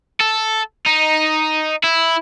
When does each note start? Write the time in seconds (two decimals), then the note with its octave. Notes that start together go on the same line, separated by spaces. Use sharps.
0.20 A4
0.86 D#4
1.84 E4